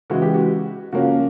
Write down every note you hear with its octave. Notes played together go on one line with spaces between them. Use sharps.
C#3 E3 G#3 F#4
G4
F#4
C#3 F3 A#3 C#4 F#4